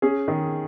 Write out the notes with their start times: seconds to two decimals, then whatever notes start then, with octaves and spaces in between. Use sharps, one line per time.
0.02 C#4 G#4
0.28 D#3